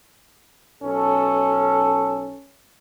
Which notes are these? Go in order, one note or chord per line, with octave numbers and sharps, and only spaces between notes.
B1 C#4 A4